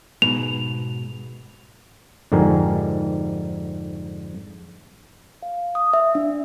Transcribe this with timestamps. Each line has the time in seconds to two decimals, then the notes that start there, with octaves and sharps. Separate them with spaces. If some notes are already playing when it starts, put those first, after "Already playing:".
0.22 G#2 B2 F7
2.32 F2 G#2 D3 G4 A#4 G#5
5.43 F5
5.75 D#6
5.94 E5
6.15 D4